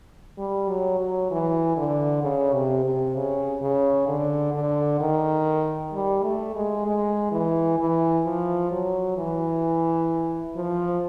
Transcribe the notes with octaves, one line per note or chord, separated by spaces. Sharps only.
G3
F#3
F#3
E3
D3
C#3
C3
C3
C#3
C#3
D3
D3
D#3
G3
A3
G#3
G#3
E3
E3
F3
F#3
E3
F3